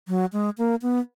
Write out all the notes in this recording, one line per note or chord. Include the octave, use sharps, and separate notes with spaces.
F#3
G#3
A#3
B3